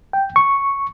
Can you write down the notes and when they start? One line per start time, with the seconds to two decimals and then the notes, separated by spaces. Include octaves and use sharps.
0.13 G5
0.36 C#6